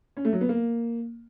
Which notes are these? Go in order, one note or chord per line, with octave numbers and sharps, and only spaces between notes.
C#4
A3
F#3
B3
A#3